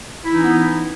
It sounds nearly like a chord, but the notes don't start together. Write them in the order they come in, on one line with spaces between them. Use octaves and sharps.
E4 E3 D#4 C#4 B3